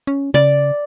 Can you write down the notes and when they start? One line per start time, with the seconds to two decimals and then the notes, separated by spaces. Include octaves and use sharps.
0.07 C#4
0.34 C#3 D5